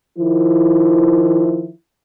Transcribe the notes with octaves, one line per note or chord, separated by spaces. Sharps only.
D#3 F3 E4